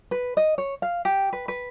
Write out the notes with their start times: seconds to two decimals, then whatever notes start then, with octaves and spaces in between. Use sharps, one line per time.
0.11 B4
0.37 D#5
0.58 C#5
0.82 F5
1.05 G4
1.33 B4
1.48 B4